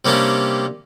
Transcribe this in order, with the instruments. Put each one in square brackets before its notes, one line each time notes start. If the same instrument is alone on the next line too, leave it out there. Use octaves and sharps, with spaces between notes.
[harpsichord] C3 G3 A#3 C#4 D4